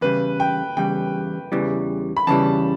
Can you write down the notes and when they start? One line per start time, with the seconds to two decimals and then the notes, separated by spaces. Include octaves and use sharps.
0.01 E2 C#3 G3 B4
0.40 G5
0.77 E2 C#3 G3 G5
1.52 E2 C#3 E3 G3
2.17 B5
2.27 E2 C#3 E3 G3 A5